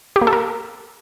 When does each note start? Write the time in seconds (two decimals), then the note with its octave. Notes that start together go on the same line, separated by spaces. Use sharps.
0.16 G4
0.21 A#3
0.27 A4
0.33 A#4